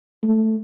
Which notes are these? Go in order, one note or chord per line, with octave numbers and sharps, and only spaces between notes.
A3